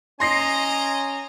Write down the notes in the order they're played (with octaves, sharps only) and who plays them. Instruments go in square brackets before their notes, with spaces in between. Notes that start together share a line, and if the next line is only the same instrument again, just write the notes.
[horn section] C#4 G#5 A#5 [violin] D#5 D7 [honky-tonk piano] C6 A#6 C7